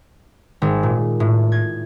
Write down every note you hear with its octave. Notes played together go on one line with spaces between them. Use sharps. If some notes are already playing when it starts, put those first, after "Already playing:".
G#1
A#2
A2
G#6